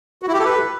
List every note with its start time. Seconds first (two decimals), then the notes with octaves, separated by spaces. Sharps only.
0.22 F#4
0.28 E4
0.34 G4
0.39 A4
0.45 B4